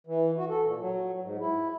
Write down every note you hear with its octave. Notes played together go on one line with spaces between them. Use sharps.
E3
F#4
A4
A#2
F#3
G#2
E4